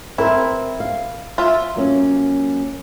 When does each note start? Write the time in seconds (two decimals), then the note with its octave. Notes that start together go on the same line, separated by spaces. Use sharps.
0.18 C4 E4 A#4 C5
0.80 F5
1.38 F4 E5
1.76 F#3 A#3 C#4